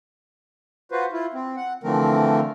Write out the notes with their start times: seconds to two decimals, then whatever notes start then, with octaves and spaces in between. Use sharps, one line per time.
0.92 F4 F#4 B4 C5
1.12 E4 F4
1.34 C4
1.56 F#5
1.83 D3 E3 F3 A3 C4 A#4